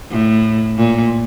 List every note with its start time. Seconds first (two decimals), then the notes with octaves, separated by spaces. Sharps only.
0.11 A2
0.78 A#2